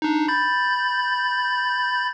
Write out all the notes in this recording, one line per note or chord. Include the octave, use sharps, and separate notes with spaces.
D4 D#4
B5 G6 A6